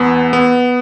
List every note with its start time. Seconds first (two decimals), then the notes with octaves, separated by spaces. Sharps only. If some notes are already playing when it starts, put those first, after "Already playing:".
Already playing: E2 B3
0.33 B3